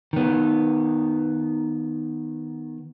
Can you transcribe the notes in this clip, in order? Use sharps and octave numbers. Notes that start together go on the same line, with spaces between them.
D#3 B3